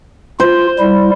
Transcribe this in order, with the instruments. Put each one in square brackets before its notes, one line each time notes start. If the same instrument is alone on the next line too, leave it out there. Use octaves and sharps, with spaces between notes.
[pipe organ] F4 [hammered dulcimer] C5
[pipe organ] G3 E4